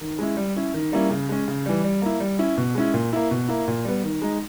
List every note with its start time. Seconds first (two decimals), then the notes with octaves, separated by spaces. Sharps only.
0.01 D#3
0.19 G#3 C#4 E4
0.37 G3
0.56 C#4 E4
0.74 D#3
0.92 G3 A#3 C#4 E4
1.10 C#3
1.29 G#3 C#4
1.48 C#3
1.66 E3 G3
1.84 G3
2.02 A#3 E4
2.20 G3
2.39 C#4 E4
2.57 B2
2.75 G#3 C#4 E4
2.94 A#2
3.13 A#3 E4
3.31 B2
3.48 A#3 E4
3.68 A#2
3.85 G3 B3
4.04 D#3
4.22 G#3 D#4